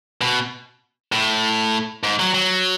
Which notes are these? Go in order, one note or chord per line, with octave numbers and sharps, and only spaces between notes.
B2
A2
G#2
F#3
F#3